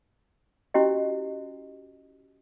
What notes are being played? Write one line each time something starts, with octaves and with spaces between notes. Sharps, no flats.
C#4 E4 F#4 G4 D#5